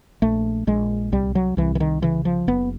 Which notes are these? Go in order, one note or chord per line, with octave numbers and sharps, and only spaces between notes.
A#1 A3
A#1 G#3
C2 G3
F#3
C2 E3
E3
D#3
C#3 E3
F3
F#1 B3